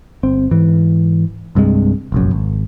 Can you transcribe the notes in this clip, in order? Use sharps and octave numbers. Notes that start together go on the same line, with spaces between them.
G1 C4
G#2 E3
C2 G2 C3 G#3
F1 A#1 F#2
G#1